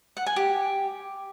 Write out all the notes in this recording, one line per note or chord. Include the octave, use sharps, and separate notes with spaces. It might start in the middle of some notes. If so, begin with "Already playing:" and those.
F#5
G#5
G4